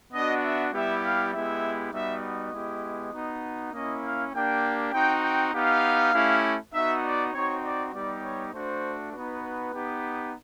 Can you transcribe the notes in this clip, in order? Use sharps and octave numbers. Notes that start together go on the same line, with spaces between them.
B3 D4 F#4 D#5
E5
G3 B3 E4 G4 E5
F5
G#3 B3 E4 G4 E5
G3 B3 D#4 F#4 E5
D#5
G#3 B3 E4 G4
B3 D#4 F#4
A#3 C#4 E4 D#5
F5
A#3 D4 G4 G5
C4 D#4 F#4 G5
G5
B3 D#4 G4 F5
A3 C#4 E4 G4
B3 D#4 F#4 E5
D5
C4 D#4 F#4 C#5
D5
G3 B3 D#4 G4 D5
C#5
A3 D4 F#4 C5
B3 D#4 F#4 B4
B3 D#4 G4